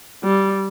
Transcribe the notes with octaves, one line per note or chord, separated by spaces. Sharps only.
G3